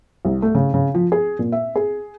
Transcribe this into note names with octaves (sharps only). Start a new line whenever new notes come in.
C2
A3
C#3
C#3
F3
G#4
A#2
E5
G#4